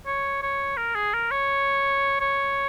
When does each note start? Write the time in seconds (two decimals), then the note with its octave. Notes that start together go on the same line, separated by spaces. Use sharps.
0.07 C#5
0.43 C#5
0.77 A#4
0.95 G#4
1.14 A#4
1.31 C#5
2.21 C#5